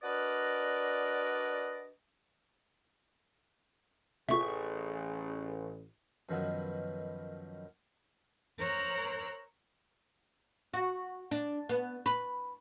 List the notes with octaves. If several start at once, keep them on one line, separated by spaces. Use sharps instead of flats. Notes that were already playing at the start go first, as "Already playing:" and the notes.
D4 F#4 A#4 B4 D5 D#5
A1 C3 A3 F4 G#4 E5 C#6
F#2 B2 D#3 F3 B3 E4
A#4 C5 C#5 A#5 E6 F#6
F#4
D4
B3
B4